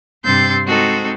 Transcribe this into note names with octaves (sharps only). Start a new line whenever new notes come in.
G2 C3 C6 E6 G6 A6
G#3 C4 D#4 F#4 A4